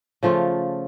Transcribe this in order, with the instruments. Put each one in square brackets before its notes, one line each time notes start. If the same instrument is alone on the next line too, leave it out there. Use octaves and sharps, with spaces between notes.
[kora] C#3 F3 A3 F4